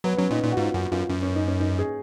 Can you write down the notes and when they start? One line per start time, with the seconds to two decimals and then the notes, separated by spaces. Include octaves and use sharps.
0.04 F#3 B3
0.17 F#3 C#4
0.31 A#2 D#4
0.43 A#2 D#4
0.52 F#4
0.57 G#2 F4
0.74 F#2 F#4
0.91 F#2 F4
1.09 F#2 C#4
1.22 C#4
1.35 D#4
1.47 C#4
1.60 D#4
1.79 G#4